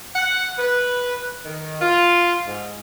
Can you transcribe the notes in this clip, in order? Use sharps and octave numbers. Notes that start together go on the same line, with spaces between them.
F#5
B4
D#3
F4
G#2